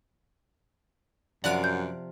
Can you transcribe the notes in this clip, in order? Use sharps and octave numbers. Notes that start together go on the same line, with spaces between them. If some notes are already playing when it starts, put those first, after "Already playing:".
F#2 C3 F3 D5 F5 F#5 F#6 D7
G6